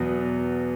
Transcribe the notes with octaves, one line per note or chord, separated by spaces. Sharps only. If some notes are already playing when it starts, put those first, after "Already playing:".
Already playing: E2 B2 F#3 B3